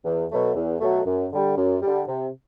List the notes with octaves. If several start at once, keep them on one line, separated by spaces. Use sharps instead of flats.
E2
B2 F#3 A3
E2
B2 F#3 A3
F#2
D3 G3
F#2
D3 G3
C3